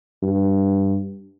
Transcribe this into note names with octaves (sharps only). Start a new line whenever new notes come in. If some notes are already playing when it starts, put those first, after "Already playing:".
G2